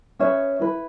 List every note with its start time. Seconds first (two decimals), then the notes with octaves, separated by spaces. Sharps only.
0.19 C#4 G#4 B4 C#5 E5
0.60 E4 B4